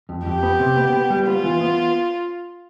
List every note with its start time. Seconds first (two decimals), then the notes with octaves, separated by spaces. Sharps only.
0.09 F2
0.26 F2 G4
0.43 B3
0.60 C3
0.77 B3
0.93 B3
1.10 G3
1.27 B3 F4
1.43 E3
1.61 B3